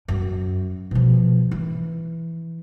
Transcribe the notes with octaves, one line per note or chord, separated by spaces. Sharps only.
F#2
B2 F3
E3